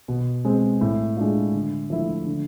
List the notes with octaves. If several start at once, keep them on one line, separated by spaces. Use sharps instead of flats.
B2
G#3 C4
A2
G#3 D4 F4
D3
F3 A3 E4
D3